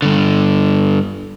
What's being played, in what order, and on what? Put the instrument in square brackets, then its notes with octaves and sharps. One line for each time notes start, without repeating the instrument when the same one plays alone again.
[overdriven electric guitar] G2 D3